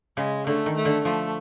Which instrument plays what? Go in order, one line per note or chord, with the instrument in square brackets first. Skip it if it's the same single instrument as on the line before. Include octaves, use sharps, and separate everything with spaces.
[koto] C#3 [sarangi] G#3
[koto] D3 [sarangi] A3
[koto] D#3
[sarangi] A3
[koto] D3
[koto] F3 [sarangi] A3